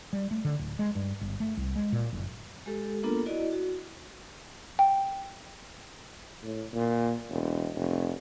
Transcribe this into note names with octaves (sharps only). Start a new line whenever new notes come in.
G3
A3
D3
D1
G#3
G2
G1
A3
C2
G#3
A#2
F#1
G#3 G4 A4
A#3 B3 D4 F4 A4 A#4
E4 F#4 D5 D#5
F#4
G5
A2
A#2
E1
F1